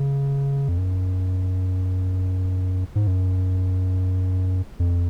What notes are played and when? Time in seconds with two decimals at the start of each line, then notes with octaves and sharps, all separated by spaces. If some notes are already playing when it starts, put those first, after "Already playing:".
Already playing: C#3
0.69 F2
0.78 F#2
2.95 G#2
3.07 F#2
4.79 F2